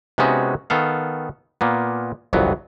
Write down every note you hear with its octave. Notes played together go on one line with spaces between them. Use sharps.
C3 G#3 B3 C#4 D#4 F#4
D#3 B3 A4 F5
A#2 A#3 B3
G1 C2 F2 F#3 B3